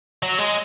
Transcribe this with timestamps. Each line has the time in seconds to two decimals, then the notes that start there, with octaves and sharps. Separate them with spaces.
0.23 F#3
0.38 G#3